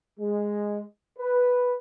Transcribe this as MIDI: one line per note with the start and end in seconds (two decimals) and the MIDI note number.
0.20 0.82 56
1.19 1.75 71